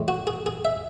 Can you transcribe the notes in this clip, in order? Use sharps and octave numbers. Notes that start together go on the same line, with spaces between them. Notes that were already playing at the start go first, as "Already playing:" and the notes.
Already playing: A2 E3 G#3
F#4
G#4
G#4
E5